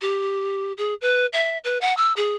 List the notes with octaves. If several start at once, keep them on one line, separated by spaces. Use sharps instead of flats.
G4
G#4
B4
E5
B4
F#5
E6
G#4